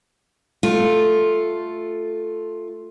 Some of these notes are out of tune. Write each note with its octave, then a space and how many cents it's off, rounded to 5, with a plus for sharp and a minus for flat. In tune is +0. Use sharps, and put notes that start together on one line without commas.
A3 +0 F4 +5 A4 +0